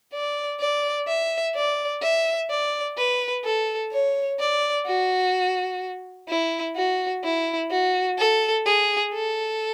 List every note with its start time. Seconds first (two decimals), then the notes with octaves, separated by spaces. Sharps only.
0.13 D5
0.60 D5
1.08 E5
1.55 D5
2.02 E5
2.50 D5
2.98 B4
3.45 A4
3.92 C#5
4.40 D5
4.87 F#4
6.28 E4
6.76 F#4
7.24 E4
7.71 F#4
8.18 A4
8.66 G#4
9.14 A4